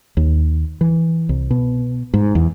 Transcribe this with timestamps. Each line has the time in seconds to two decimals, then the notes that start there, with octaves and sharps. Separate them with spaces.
0.17 D#2
0.81 E3
1.29 C2
1.51 B2
2.14 G#2
2.35 E2